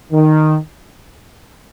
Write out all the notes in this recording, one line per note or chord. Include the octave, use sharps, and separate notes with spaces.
D#3